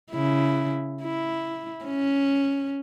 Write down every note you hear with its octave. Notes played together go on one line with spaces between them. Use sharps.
C#3 E4
E4
C#4